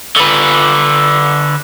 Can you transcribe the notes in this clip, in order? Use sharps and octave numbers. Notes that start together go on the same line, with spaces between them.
D3 B4